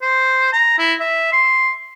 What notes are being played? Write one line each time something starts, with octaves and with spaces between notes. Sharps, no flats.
C5
A#5
E4
E5
C6